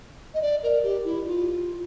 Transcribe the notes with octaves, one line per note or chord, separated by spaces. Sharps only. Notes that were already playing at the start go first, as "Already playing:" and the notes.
D#5
D5
A#4
G4
E4
F4